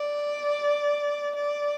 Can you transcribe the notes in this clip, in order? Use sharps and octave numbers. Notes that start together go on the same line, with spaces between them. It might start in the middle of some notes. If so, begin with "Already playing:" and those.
Already playing: D5
D5